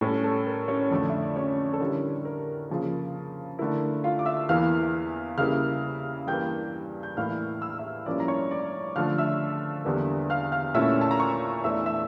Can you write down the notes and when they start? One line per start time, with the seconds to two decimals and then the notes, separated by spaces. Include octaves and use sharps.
0.01 A2 G3 C#4 A4
0.24 A4
0.47 A#4
0.68 C#4 C#5
0.90 F2 D3 A3 D4 D5
1.09 E5
1.22 D5
1.36 C#4 C#5
1.73 A4
1.80 D3 G3 C#4 E4 A#4
2.25 A#4
2.69 C#3 F3 A#3
3.59 D3 A3 E4 A#4
4.04 F4 F5
4.19 D6
4.26 E5 E6
4.49 E2 E3 A#3 E4 F5 F6
5.37 C#3 G3 A#3 E4 F5 F6
6.27 G2 E3 G3 A#3 G5 G6
7.03 G6
7.17 A2 E3 A#3 E4 F5 F6
7.62 E6
7.70 F6
7.78 E5 E6
8.06 G2 F3 A#3 C#4 E4 D5 D6
8.20 A#5
8.28 C#5 C#6
8.51 D5 D6
8.96 D3 F3 A3 F5 F6
9.18 E5 E6
9.85 E2 D3 G3 A#3
10.30 F5 F6
10.52 F5 F6
10.74 A#2 A3 C#4 E4 E5 E6
11.01 A5
11.11 A#5
11.20 C#5 C#6
11.64 E2 E3 A3 D4 E5 E6
11.86 E5 E6